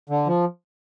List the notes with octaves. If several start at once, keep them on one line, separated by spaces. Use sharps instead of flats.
D3
F3